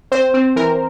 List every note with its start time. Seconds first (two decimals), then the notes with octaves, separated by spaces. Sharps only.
0.12 C4 C5
0.34 C4
0.56 E3 A#4